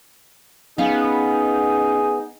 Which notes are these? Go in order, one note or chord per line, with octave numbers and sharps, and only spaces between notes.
B3 C#4 D#4 G#4 F5